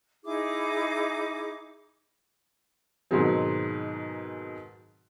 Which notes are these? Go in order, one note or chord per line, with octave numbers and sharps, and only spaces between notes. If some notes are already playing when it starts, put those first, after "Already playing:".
D#4 E4 G#4 D6
G#2 B2 D#3 F#3 G#3 C4